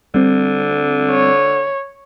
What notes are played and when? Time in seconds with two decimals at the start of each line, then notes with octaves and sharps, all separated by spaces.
0.15 D3 G3 C4
1.11 C#5